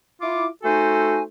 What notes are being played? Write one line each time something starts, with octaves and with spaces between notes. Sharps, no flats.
E4 F4 D6
A3 D#4 F#4 A4 C5 G#5